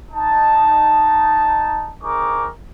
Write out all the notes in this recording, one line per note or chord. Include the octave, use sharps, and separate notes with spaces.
D#4 A5
C4 D#4 G#4 A#4 C#6 D6